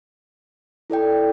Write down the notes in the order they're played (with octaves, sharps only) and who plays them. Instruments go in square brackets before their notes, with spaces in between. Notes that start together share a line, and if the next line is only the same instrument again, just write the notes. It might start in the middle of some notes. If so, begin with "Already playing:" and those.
[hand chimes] E4 A4 D5 G5